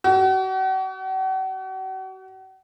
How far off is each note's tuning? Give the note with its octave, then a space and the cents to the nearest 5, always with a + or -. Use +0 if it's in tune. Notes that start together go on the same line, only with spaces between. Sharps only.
F#4 +40